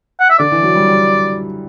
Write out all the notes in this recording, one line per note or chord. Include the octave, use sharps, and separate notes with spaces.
F#5
E5
D3 D5
E3
F#3
G3
G3